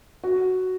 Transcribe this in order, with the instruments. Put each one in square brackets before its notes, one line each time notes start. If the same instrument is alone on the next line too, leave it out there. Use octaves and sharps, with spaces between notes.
[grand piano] F#4